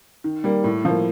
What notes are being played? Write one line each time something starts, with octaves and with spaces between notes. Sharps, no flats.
D#3
G3 A#3
A2
F3 A#3